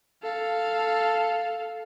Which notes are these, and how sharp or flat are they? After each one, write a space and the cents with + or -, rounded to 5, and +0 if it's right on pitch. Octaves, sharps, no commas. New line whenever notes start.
A4 +0 F5 +0